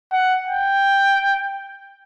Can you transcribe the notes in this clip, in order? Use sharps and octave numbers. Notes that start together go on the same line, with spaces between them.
F#5
G5